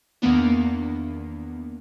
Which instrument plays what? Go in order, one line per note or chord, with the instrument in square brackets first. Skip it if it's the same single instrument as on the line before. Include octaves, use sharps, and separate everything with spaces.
[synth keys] E2 D#3 A#3 B3 D4